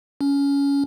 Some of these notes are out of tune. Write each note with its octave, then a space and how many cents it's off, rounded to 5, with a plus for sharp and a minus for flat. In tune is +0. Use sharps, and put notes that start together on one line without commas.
C#4 +20